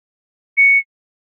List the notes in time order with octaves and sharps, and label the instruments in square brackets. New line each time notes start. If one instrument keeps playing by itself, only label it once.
[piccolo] C#7